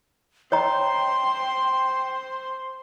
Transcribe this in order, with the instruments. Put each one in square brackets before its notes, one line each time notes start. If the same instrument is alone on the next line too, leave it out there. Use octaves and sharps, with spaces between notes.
[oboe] C5 [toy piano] C#5 D#5 A#5 [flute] G5 [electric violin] C6